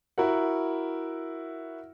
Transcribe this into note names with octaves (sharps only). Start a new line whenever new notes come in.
E4 F#4 A#4 F#5